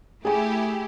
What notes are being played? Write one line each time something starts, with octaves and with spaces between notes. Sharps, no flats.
A3 E4 G4 G#4 G#5